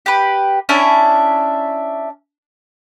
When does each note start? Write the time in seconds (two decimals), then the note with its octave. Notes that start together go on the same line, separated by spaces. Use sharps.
0.06 G4 B4
0.69 C#4 D4 E4 E5